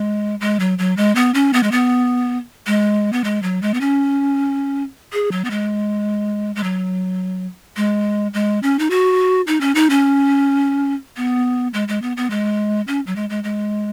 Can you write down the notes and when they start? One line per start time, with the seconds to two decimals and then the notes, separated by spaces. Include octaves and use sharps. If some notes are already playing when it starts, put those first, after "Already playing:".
Already playing: G#3
0.41 G#3
0.60 F#3
0.79 F#3
0.97 G#3
1.15 B3
1.34 C#4
1.53 B3
1.63 G#3
1.72 B3
2.67 G#3
3.13 B3
3.24 G#3
3.43 F#3
3.62 G#3
3.74 B3
3.81 C#4
5.13 G#4
5.32 F#3
5.45 B3
5.51 G#3
6.56 G#3
6.63 F#3
7.77 G#3
8.34 G#3
8.63 C#4
8.79 D#4
8.90 F#4
9.47 D#4
9.61 C#4
9.75 D#4
9.90 C#4
11.17 B3
11.74 G#3
11.88 G#3
12.02 B3
12.17 B3
12.30 G#3
12.88 C#4
13.07 F#3
13.16 G#3
13.30 G#3
13.44 G#3